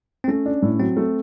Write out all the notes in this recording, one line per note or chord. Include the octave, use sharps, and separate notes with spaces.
C4
A3 C#4
D4
A2
F#3 C4
A3